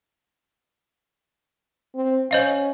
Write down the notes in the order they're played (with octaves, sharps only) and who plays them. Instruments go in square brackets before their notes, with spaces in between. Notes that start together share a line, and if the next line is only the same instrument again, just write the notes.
[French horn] C4
[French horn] C#4 [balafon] C5 D#5 F5